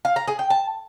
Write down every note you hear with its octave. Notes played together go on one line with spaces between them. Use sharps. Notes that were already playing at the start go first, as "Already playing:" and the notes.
F5
A#5
G#4
G5
A5